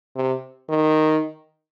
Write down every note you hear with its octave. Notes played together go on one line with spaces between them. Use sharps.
C3
D#3